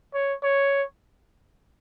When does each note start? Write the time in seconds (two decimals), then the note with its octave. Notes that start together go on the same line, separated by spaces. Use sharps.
0.14 C#5
0.43 C#5